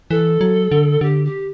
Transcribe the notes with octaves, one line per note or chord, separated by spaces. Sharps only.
E3 A4
F#3
D3
D3 G4
G4